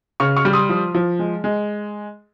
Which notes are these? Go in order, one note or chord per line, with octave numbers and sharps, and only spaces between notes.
C#3 C#6 F6
C#6 F6
G3
C6 D#6
F3
F3
G#3
G#3